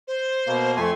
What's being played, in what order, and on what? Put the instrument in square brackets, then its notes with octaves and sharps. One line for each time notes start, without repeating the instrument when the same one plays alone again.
[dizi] C5
[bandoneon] B2 A#3
[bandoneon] F2 A3 G#5 [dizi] C6